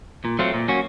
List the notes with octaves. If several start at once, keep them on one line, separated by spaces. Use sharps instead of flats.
A#2
F#3 A3 C4 F4
A#2
F#3 A#3 C#4 F#4